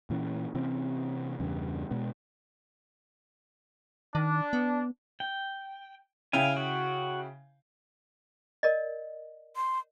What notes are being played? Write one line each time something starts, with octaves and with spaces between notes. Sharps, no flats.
A#2 E3 C#4
C3 E3 C4 C#4
E2 G2 C#3
B2 G#3 B3
D#3 D4
B3
G5
C#3 E4 F5 G5 G#5
F#4
A#4 D5 D#5
C6